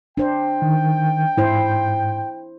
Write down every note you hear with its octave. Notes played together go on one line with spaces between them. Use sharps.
D4 C5 G5
D#3
G#2 E4 C5